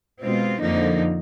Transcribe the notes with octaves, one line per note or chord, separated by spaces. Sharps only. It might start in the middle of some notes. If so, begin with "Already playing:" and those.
B2 G#3 C4 F4
F2 D3 F3 A#3 D#4